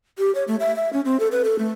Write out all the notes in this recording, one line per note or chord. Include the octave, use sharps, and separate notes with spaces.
G4
C#5
A3
E5
E5
C#4
C4
A4
B4
A4
A3